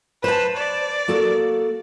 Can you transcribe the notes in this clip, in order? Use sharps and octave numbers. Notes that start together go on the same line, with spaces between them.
B4 C5 A5
D5
A#3 F#4 A4